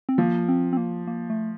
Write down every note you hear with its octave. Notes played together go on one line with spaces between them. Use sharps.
C4
F3 A#3
C4
C4
A#3
A#3
A3